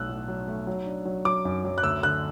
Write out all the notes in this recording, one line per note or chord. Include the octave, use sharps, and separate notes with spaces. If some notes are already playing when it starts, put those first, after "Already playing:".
Already playing: B1 F#3 A3 E6 F#6
A2
F#3
A3
F#3
D4
F#3
F#3 D6
F#2
F#3
F#6
D2 E6
D3 F#6